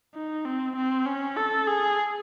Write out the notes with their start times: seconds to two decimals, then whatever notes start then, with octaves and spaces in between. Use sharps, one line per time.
0.15 D#4
0.45 C4
0.76 C4
1.06 C#4
1.36 A4
1.67 G#4